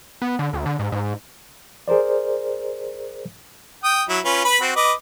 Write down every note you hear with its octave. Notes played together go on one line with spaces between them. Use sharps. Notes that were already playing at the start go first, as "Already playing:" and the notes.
B3
D3
D2
D3
G#2
G#2
G#4 A#4 C5 D5
G5 D#6
F#3 E4
C#4 F4 B4
B4 B5
C4 F#4
B4 D#5 D6